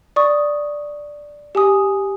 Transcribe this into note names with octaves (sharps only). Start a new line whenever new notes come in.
D5 C#6 D#6
G4 G#5 D#6